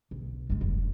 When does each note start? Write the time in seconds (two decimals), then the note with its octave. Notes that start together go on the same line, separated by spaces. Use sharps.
0.11 B1
0.50 G2 G#3
0.61 F1